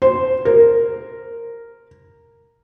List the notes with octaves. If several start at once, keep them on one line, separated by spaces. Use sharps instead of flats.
C5
A#4